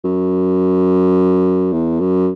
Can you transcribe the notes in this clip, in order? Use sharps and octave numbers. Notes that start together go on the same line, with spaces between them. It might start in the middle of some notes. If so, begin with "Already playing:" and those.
F#2
E2
F#2